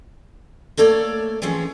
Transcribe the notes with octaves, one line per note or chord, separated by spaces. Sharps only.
A3 A#3 A4 C#5 D5
E3 F3 C4 C#4 G#4